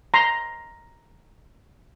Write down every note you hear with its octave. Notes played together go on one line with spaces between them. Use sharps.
A#5 C6